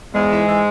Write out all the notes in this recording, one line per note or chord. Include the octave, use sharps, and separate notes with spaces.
E2 G#2 G#3
E3
E3